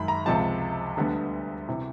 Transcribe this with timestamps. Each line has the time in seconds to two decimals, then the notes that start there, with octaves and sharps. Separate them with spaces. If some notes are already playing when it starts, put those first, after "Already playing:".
Already playing: F#2 D#3 G#3 B5
0.08 A#5
0.26 C#2 C3 F3 G#3 A5
0.97 D2 D3 G3 B3
1.69 C3 E3